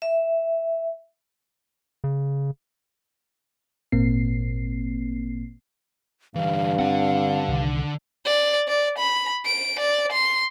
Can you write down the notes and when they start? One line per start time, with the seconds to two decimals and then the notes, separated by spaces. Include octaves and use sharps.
0.02 E5
2.04 C#3
3.92 G#1 A#2 A#3 C4 C7
6.35 G2 D3 E3 F5
6.79 D3 C4 F#5
7.48 C2 D#3
8.25 D5
8.68 D5
8.98 B5
9.45 D7
9.80 D5
10.12 C6